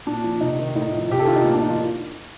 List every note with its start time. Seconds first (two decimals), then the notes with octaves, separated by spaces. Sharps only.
0.06 A#2 D4
0.24 F3
0.41 C3 D#4
0.59 D#3
0.75 A2 D#4
0.93 F3
1.10 C3 G4
1.19 A4
1.27 D#3 F4
1.36 D#4
1.44 A2 A#3
1.53 D4
1.62 F3 D#4
1.70 F4